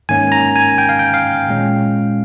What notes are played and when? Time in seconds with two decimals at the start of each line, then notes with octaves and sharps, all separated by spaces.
0.09 G#2 D#3 A#3 C#4 G#5
0.32 A#5
0.56 G#5
0.78 G5
0.89 F5
0.99 G5
1.14 F5
1.49 A#2 G#3 C#4